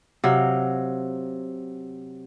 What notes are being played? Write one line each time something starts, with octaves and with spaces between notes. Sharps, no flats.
C3 F#3 F5